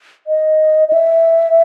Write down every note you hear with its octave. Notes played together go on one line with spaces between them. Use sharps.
D#5
D#5
E5